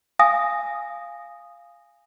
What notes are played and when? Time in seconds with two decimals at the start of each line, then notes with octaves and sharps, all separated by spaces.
0.19 F5 G#5 D#6 A#6